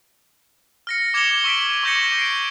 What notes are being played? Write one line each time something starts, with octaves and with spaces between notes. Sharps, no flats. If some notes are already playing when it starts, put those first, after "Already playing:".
F6 A#6 C#7
D6 G#6 C#7 E7 F7 G7
D6
C#6 E6 B6 D7
C#6 D6 G6 A#6 B6 C#7
C7 D7